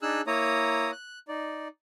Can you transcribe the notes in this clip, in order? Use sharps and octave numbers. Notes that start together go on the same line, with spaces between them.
D4 D#4 G#4 E6 F#6
A#3 E4 C#5 A#5 D#6
F#6
D#4 D5